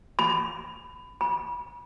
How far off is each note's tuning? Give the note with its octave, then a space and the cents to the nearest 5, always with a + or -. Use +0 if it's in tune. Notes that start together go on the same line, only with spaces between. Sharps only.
B5 +20
B5 -35